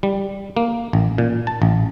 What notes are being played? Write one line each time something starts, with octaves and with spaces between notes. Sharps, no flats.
G3
A#3
A1
A#2
A5
A1